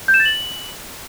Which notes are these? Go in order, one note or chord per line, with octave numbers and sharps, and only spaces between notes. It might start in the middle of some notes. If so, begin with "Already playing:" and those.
G6
E7
A6
F#7